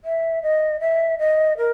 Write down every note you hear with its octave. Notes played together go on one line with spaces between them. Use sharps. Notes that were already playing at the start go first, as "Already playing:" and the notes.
E5
D#5
E5
D#5
A#4